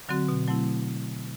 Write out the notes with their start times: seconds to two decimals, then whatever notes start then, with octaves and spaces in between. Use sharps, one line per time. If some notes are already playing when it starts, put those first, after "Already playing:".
0.09 D3 F#3 C4 F#4
0.28 B2
0.48 F#3 A3 C4 E4
0.68 B2